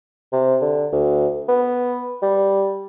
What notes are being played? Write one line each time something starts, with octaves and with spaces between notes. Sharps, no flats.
C3
D3
D2
B3
G3